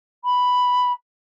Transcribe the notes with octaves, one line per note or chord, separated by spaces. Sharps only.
B5